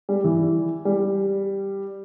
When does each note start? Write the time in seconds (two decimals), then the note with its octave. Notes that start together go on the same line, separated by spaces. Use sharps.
0.09 G3
0.24 E3
0.85 G3